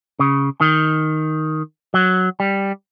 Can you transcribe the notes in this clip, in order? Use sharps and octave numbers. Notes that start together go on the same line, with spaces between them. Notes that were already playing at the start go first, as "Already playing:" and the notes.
C#3
D#3
F#3
G3